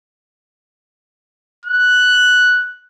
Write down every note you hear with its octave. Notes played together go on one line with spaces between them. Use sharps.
F#6